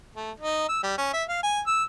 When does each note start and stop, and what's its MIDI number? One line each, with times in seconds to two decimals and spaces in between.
0.16 0.31 57
0.40 0.68 63
0.69 0.79 88
0.83 0.96 55
0.98 1.10 61
1.13 1.24 76
1.29 1.41 77
1.43 1.60 80
1.67 1.84 88